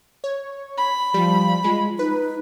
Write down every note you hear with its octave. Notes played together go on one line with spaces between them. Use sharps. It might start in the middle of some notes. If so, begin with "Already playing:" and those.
C#5
B5
F3 G3
G#3 F4
D#4 B4